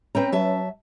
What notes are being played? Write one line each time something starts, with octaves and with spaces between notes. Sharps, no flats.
C4 C#4 B4 G5 A#5
F#3 E5 A5